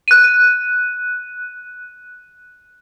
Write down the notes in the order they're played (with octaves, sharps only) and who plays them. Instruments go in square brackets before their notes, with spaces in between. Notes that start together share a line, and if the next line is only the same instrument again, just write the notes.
[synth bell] F#6 D#7